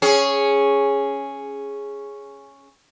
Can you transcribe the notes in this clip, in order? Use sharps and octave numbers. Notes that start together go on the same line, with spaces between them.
C#4 G#4